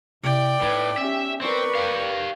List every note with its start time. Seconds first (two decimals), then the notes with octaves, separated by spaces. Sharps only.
0.23 C3 E4 D5 G5
0.62 A2 B3 D#4 B4
0.98 C#4 G4 E5
1.42 C4 A#4 B4 D5 C#6
1.75 G4 F5